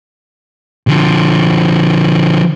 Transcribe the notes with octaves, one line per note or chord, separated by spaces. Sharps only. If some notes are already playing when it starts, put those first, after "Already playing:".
D3 F3